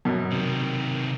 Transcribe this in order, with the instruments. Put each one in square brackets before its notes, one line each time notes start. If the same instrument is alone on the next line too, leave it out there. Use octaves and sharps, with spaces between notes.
[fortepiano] F#2 B2
[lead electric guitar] C3 D#3